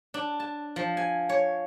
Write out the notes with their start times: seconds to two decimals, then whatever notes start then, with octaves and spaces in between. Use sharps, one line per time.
0.14 D4
0.40 A5
0.76 F3
0.97 G#5
1.29 C#5